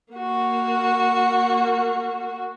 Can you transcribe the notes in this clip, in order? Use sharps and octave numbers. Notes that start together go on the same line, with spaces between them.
A#3 F#4